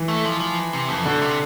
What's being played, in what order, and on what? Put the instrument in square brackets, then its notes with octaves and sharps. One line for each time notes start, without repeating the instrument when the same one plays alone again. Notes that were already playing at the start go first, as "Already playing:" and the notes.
Already playing: [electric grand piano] E3
[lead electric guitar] A3
F3
F3
C3
F2
[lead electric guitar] B2 [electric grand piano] D3
[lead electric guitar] C3